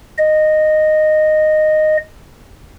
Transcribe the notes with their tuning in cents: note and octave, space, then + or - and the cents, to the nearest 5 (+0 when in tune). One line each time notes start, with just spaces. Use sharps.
D#5 -10